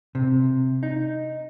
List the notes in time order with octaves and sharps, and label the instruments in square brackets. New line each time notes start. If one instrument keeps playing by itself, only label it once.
[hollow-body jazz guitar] C3
D#4